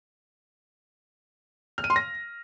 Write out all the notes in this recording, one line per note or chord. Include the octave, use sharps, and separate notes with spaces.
F6
D#7
C6
A#6